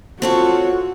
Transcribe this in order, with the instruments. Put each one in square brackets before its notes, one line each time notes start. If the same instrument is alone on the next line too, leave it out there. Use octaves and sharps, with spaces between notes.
[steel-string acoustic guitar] C4 A4 C#5 [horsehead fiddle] F4 F#4